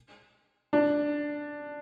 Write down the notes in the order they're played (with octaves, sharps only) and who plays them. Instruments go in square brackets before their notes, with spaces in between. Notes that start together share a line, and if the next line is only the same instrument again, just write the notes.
[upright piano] D4